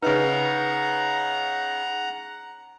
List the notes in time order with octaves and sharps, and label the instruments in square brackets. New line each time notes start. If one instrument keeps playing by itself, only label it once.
[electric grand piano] C#3 D#4 [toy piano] B4 E5 [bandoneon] F#5 A#5